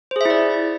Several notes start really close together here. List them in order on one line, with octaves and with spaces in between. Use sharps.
C5 G#4 E5 E4 D5